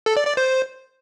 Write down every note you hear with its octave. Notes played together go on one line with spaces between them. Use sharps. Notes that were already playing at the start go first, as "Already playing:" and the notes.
A4
D5
D5
C5